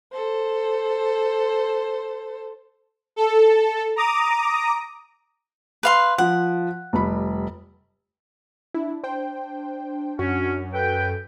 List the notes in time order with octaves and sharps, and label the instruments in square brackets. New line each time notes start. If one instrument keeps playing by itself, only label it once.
[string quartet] A4 C5
[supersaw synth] A4
A#5 D6 D#6
[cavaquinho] B4 F5 C6
[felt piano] F3 [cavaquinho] F#5
[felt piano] F1 G3 B5
[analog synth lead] D4 [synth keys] E4
[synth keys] C5 G5
[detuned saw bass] F#2 [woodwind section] C#4 [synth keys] F#4
[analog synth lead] A4 [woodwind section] B4 G5